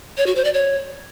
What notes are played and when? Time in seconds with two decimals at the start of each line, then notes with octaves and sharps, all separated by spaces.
0.17 C#5
0.26 F#4
0.35 C5
0.44 D5
0.53 C#5